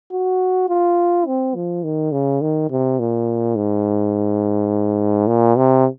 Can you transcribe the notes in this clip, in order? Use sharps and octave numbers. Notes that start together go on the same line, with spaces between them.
F#4
F4
C4
F3
D#3
C#3
D#3
C3
A#2
G#2
A#2
C3